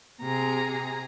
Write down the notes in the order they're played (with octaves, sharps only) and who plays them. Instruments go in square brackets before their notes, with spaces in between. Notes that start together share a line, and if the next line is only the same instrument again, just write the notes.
[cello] C3 [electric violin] G#4 A#5